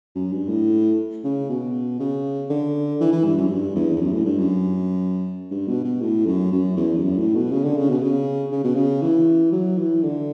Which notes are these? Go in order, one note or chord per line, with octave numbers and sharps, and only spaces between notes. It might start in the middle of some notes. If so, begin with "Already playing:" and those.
F#2
G2
A2
C#3
B2
C#3
D3
E3
E3
G2
F#2
G2
E2
E2
F#2
A2
G2
F#2
G2
B2
B2
A2
F#2
F#2
E2
G2
F#2
A2
B2
C#3
D3
C#3
B2
C#3
C#3
B2
C#3
E3
F#3
E3
D3